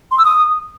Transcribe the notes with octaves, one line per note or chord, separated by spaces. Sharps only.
C6
E6
D#6